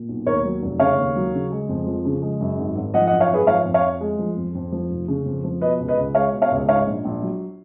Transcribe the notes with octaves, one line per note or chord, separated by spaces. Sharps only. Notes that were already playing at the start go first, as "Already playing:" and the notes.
Already playing: A#2
B1
D#2 A#4 C#5
F#3
F1
C#3 C#5 F5
D#2
F#3
C#3
G#3
F2
F3
C#3
G#3
F#2
G#1
G#1
F3 D#5 F#5
D#5 F#5
F#2
C#5 F5
G#1 G#4 B4
F3 C#5 F5
F2
C#5 F5
F2
G#3
F3
F2
F2
F3
F1
C#3
F2
F3
B2 B4 D#5
C#2
B4 D#5
C#2
G#3 C#5 F5
B2
C#5 F5
C#2
G#2 C#5 F5
A#1
A#1
F#3